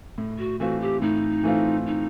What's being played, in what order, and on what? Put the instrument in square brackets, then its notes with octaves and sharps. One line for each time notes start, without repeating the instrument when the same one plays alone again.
[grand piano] A2
[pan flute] F#4
[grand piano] E3 A3 C4 F4 [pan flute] F#4
[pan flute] G4
[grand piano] A2 [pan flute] D#4
[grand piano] E3 A3 C4 F4
[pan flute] D#4